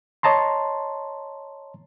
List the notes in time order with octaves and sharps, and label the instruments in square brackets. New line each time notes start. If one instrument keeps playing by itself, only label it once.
[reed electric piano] C#5 D#5 A5 A#5 C6